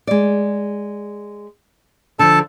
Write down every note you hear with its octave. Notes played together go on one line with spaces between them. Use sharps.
G#3 D5
D3 F3 A4 A5